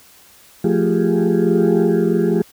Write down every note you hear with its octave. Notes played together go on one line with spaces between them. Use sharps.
F3 A3 F4 G4 G#4